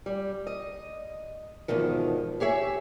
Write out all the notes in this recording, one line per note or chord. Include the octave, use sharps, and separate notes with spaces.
G3
D#5
E2 G#2 B2 D#3 F3
G4 G#4 C#5 E5